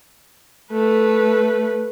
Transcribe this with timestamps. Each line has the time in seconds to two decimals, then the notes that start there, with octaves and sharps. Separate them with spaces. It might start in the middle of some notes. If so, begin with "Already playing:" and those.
0.72 A3 B4